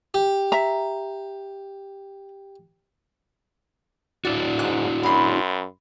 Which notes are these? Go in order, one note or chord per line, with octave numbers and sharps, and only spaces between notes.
G4
E5 A#5
D4 E4 F#4 D5
G#2 F#6
F#2 B5 C6